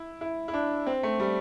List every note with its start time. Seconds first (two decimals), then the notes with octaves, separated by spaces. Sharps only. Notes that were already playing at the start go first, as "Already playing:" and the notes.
Already playing: E4
0.21 E4
0.48 E4
0.53 D4
0.87 C4
1.03 A3
1.20 G3